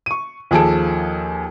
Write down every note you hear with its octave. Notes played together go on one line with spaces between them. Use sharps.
C#6 D#7
D#2 F3 G#4 A4 A5 D7